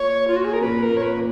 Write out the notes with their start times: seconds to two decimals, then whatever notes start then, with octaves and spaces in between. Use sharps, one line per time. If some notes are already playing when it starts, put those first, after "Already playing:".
Already playing: A#2 C#5
0.28 F4
0.36 F#4
0.45 G#4
0.53 A#4
0.61 A#2 B4
0.82 A#4
0.89 A#2
0.97 C#5
1.03 B4
1.17 A#2